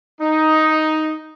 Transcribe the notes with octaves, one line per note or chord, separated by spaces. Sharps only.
D#4